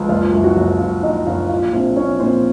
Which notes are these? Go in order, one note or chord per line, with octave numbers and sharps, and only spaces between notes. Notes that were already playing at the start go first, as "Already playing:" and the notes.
Already playing: C#2 F3
F#1 F4 F5
F#2
F#4 F#5
F#1
F#2 F4 F5
F#1 D#4 D#5
F#1 F4 F5
A#1 F4 F5
A#1 C4 C5
A#1 C#4 C#5
A#2 C4 C5